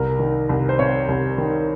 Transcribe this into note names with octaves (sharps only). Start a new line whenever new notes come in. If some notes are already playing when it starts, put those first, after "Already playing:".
Already playing: C2 A#4
D#3
C2
C5
C3 C#5
C2
D#3